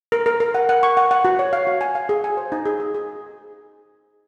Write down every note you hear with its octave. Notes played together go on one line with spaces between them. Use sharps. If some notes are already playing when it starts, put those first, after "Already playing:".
A#4
A#4
A#4
F#5
F#5
C#6
F#5
F#5
F#4
C#5
F5
F#4
G#5
F5
G#4
G#5
C5
D#4
G#4
G#4
G#4